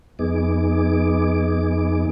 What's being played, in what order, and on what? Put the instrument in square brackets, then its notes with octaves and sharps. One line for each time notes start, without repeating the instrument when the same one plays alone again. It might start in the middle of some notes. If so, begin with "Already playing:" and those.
[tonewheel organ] F2 B3 D#4 G#4 D6